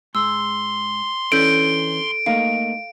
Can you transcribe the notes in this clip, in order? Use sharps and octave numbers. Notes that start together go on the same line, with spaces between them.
G#2 C6 E6
E3 C#4 D4 A4 G6 D7
A3 A#3 D#4 F5